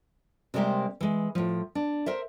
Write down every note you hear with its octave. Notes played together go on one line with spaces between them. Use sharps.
C3 G3 G#3 A#3 G4 C5
E3 G#3
A2 F3
D4
A#4 C5 E5